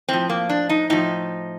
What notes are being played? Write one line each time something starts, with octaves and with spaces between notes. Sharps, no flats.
A2 F3 C4
A#3
D4
D#4
A2 F3 D#4